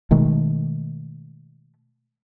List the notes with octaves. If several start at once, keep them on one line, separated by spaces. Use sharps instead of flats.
B2 D#3 G#3 A3